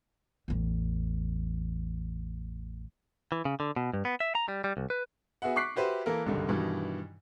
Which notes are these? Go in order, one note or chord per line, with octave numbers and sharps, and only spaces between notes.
A1 E2
E3
C#3
D3
B2
G2
B3
E5
A#5
G3
G3
C2
B4
B3 F#4 G#4 E5 F#5
C#6 D6 F#6 B6 C7
F#4 G4 B4 C5 E5
E3 A#3 A4 A#4
F#1 C2 G2 D3 D#3
G2 B2 D#3 E3